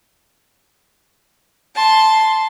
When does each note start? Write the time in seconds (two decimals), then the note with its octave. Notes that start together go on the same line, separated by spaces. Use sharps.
1.76 A5 C6